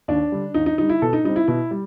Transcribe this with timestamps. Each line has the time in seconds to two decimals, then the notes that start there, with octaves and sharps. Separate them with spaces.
0.08 D#2 D4
0.32 D3 G3
0.54 D#2 D#4
0.66 D#4
0.78 D3 G3 D#4
0.89 E4
1.02 B2 A4
1.13 D#4
1.24 G3 C4 D#4
1.36 E4
1.48 B2 E4
1.71 G3